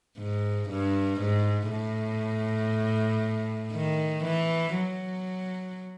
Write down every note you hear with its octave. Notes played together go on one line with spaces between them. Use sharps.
G#2
G2
G#2
A2
D#3
E3
F#3